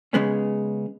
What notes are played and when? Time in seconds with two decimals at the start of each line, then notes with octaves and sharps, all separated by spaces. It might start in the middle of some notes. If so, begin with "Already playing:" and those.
0.13 C#3 G#3 B3 C#4